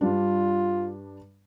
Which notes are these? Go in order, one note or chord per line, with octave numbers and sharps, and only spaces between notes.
G2 G3 D4 F4